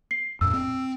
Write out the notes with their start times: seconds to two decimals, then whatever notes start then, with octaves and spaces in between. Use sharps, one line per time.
0.11 C7
0.41 F2 A#2 E6
0.54 C4